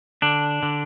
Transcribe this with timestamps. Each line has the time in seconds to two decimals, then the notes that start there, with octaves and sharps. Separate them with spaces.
0.22 D3 D4
0.63 D3